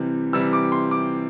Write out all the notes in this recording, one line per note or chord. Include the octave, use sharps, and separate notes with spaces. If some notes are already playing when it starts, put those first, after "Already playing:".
Already playing: C3 E3 G3
C3 E3 G3 E6
D6
C6
D6